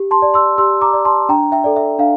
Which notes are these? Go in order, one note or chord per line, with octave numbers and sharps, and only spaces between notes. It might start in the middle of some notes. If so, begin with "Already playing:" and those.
Already playing: G4
A5 C6
D5
C6 E6
G4 C6 E6
A#5 D6
D5
A5 C6
D4 G5 A#5
E5 G5
A4 D5
E5
D4 F5